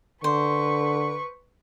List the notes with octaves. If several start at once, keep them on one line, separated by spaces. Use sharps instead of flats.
D3 B4 C5 C#6